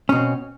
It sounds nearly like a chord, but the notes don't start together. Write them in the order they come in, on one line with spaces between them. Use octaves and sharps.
C#4 B2 C4